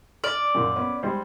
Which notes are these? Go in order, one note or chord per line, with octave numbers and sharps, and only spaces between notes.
D5 F6
F#2 A#2
B3 C#4
G3 G#3 C5